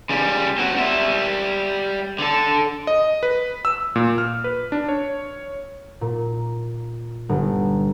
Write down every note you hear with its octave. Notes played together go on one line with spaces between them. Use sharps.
C#3 G3
C4 F#4
G3 E5
D3 A4
D#5
B4
E6
A#2
F6
B4
D4
C#5
A#2
G1